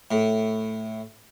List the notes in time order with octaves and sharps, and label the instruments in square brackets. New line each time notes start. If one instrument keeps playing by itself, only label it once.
[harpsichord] A2